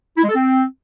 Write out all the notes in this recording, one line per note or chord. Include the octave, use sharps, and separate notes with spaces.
E4
G#3
A4
C4